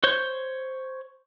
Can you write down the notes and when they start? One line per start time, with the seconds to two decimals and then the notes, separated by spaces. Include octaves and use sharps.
0.04 C5 C#5 G6